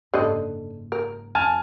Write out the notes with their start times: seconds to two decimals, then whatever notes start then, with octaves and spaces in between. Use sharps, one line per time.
0.14 F#1 G#2 D3 A4 D#5
0.92 A#4
1.35 F2 G#5 A5 F6